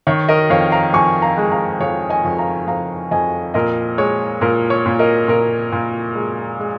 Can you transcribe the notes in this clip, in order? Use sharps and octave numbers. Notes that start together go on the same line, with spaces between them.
D#3 C#5
A#4 D#5
F2 C#5 F5
F5 A#5
F2 G#5 C#6
F5 A#5
G#3
F5 A#5
F2 C#5 F5
D#5 G#5
F2
F5 A#5
F2 F5 A#5
F2 D#5 G#5
A#2 A#4 D#5
G#3 C#5
A#2 A#4
C#5
A#2
A#4 D#5
A#2 A#4
A#2
G#3
G#3